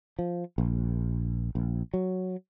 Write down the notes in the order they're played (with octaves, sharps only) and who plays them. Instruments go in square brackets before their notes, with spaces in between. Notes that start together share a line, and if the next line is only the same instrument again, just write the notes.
[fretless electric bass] F3
A#1
A#1
F#3